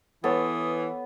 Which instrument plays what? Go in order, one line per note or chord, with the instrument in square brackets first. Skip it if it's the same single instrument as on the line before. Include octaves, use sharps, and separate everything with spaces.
[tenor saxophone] E3 [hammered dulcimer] B3 [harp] A4 C#5 [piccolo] D#6